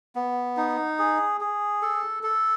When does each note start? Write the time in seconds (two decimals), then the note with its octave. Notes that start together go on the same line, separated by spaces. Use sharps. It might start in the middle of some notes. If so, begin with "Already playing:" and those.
0.15 B3
0.57 D#4
0.99 G#4
1.41 G#4
1.82 A4
2.23 A4